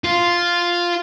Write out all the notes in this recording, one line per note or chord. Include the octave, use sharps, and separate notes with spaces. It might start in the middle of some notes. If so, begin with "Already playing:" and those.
F4